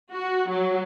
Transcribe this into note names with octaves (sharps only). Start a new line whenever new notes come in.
F#4
F#3